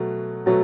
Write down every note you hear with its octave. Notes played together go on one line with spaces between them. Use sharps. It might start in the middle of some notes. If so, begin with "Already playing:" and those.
Already playing: B2 F#3 A3
B2 F#3 A3